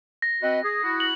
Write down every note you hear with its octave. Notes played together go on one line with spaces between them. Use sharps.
A#6
C4 F#4 B4 D#5
G#4 D#6
E4 F#4
F#7